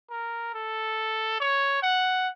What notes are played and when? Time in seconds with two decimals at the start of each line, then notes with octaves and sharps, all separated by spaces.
0.10 A#4
0.54 A4
1.40 C#5
1.83 F#5